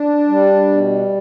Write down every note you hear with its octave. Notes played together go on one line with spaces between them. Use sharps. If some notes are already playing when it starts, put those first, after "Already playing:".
Already playing: D4
G3
B2